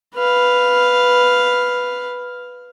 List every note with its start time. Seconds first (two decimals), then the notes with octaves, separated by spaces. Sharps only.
0.15 B4 F5